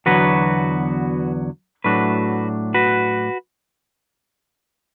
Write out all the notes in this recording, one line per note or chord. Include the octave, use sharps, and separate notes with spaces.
E2 D3 F#3 B3 F#4 B4
A2 F#3 A3 D4 F#4 B4
F#4 B4